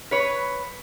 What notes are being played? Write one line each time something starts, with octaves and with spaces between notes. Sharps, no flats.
B4 C#5